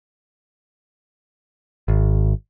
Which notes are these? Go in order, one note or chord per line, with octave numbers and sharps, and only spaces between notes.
G#1